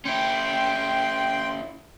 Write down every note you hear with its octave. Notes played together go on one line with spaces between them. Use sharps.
C#4 E4 G5 C6